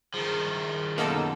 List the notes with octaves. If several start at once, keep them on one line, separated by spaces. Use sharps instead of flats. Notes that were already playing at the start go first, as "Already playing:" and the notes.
D#3 F3 G#4
F#2 B2 A#3 D#4 A4